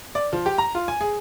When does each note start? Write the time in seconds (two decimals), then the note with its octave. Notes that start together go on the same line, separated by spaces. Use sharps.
0.15 D5
0.33 F3
0.46 G4
0.58 A#5
0.75 F4
0.88 G#5
1.01 G#4